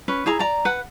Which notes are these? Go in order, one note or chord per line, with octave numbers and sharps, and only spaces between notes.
C#4 B4
E4 G#4 A#5
D5 A#5
B4 F#5